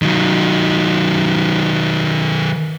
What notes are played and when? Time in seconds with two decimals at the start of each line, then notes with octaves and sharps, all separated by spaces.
0.02 D#3 F#3